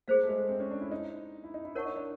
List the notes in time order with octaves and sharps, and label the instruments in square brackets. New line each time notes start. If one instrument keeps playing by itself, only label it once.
[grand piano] A#3 [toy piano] G#4 C5 F5
[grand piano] A3
G#3
A3
C4
C#4
D4
E4
D#4
E4
D#4
E4
[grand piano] E4 [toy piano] A#4 C#5 F#5 A5 C#6
[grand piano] D#4
D4